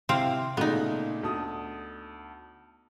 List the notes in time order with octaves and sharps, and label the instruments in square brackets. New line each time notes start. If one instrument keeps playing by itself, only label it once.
[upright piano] C3 E4 D7 [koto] C4 C5 F5
[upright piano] A#2 C#3 A3 [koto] B3 D#4
[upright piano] D2 A5 D#6